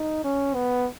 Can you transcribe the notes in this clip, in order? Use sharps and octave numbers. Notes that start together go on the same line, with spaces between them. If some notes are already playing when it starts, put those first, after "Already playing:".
Already playing: D#4
C#4
B3